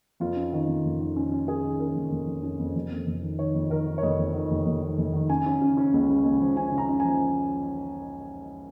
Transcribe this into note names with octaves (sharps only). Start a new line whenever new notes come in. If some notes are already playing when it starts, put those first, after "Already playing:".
F2 F4
C#4
D#3
F2
F1
D#3
C#4
C#4
C#4 G#4
D#3
C#4 A#4
F1
F1
F2
C#4
F2
F1
F2
F1
D#3
D#3 C#5
F2
D#3 A#4
D#3
C#5
F1 D#5
F2
D#3
F1
F1
D#3
F1
D#3
C#3 G#5
C#4
C#3
C#4
C#2
C#3
C#2
F3
C#3 G#5
C#3
A#5
C#4
F3 G#5